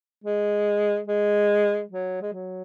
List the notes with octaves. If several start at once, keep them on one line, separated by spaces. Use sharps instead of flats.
G#3
G#3
F#3
G#3
F#3